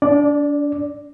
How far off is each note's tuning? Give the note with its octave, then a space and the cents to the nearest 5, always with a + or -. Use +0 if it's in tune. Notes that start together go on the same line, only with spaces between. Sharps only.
D4 -30 D5 +0